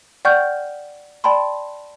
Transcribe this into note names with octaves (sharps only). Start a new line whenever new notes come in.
D5 F#5 G5 C#6 F6 G6
D5 G5 A5 B5 C6